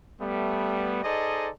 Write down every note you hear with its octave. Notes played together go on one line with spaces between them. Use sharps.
G3 A3 B3
D#4 G#4 A4 C5 D5 D#5